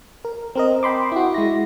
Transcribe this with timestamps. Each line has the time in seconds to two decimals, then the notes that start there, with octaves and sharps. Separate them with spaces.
0.25 A#4
0.55 C4 A#4 D#5
0.83 G5 B5 C6 D6
1.12 E4 F#4
1.34 G#3 E4 A#6